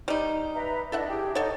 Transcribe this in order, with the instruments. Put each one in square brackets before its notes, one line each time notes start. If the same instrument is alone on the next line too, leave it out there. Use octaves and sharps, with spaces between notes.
[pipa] G3 D#4
[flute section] B4 E5 A#5
[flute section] D4 E4 D#5 [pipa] A4 E5 F#5
[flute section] G4 G#4 G5
[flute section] D#4 F#5 [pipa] A4 C#5